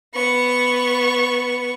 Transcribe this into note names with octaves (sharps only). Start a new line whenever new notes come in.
B3 C#6